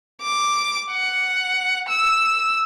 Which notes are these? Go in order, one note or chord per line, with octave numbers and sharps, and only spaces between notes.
D6
F#5
E6